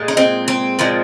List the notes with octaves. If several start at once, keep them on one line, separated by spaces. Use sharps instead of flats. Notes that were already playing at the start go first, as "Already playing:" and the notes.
Already playing: A#2 G#3
D#4
C4
C4
A#2 F3 G#3